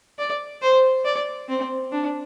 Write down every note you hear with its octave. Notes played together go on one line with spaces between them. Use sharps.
D5
C5
D5
C4
D4